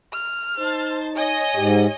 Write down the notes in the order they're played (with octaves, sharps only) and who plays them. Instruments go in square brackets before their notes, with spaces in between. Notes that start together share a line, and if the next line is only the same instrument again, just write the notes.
[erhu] F6
[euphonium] D#4 [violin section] C5 A5 A6
[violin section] C#5 D#5 [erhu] G#5
[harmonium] G#2 [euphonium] G4